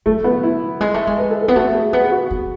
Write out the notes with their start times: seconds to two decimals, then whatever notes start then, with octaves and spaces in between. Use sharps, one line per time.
0.06 F#3 A3
0.24 B3
0.43 E4
0.81 G#3
0.94 A3
1.07 G#3
1.18 B4
1.30 A4
1.43 A4
1.48 B3
1.56 A3 F#4
1.74 G#4
1.93 B3 G#4
2.11 F#4
2.31 B3